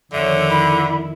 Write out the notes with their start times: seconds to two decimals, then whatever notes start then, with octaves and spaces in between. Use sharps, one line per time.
0.12 F2 D3 D#3 C#5 E5
0.50 E4 B5